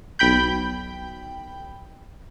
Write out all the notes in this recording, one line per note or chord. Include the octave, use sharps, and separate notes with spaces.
B1 G5 B5 G6